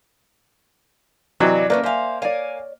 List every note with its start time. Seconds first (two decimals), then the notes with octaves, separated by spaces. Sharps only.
1.40 C3 E3 F#3 D5 D#5
1.70 D3 A3 A#3 C#4 B4 D5
1.84 C5 E5 F5 G#5
2.22 A#4 C#5 D5 F5 G#5